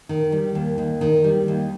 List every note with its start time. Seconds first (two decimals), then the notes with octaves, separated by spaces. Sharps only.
0.09 D#3
0.32 G3
0.55 D#2
0.78 D#2
1.01 D#3
1.24 G3
1.48 D#2